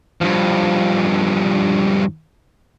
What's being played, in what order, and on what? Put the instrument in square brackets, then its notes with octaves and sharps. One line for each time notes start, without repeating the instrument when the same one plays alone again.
[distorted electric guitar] G2 F3